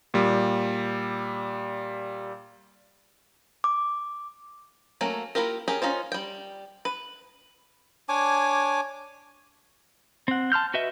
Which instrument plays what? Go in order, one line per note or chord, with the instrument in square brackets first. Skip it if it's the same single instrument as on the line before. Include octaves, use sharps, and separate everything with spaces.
[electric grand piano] A#2 G3
[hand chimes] D6
[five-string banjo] F#3 A3 A#3 C#4
A#3 E4 F4 G4 A#4
C#4 G4 G#4 A#4
C#4 D#4 F4 C5
G3 G5
B4
[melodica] D4 C#5 G#5 D6
[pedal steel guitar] C4 F#5
A5 C6 F6 G6
F#4 B4 D#5 E5